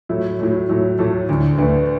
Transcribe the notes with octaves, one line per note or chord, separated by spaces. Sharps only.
A2 F#3 A3 E4
A2 F#3 A3
A2 F#3 A3
A2 F#3 A3 A4
D2 D3 A3
D2 D3 A3 B4